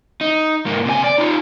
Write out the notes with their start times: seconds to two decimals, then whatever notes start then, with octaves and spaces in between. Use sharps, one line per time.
0.21 D#4
0.66 G#2 A#3
0.85 C3 G#5
1.04 D5
1.18 D#4 F4